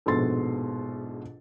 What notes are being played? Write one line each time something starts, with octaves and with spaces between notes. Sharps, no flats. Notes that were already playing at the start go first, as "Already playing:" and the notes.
A#1 G#2 B2 A4 C6 A6